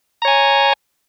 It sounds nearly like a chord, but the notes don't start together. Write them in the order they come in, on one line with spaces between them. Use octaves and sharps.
A#5 C#5 G#5